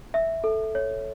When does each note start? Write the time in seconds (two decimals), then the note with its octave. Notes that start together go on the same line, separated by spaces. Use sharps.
0.14 E5
0.44 A4
0.75 C#5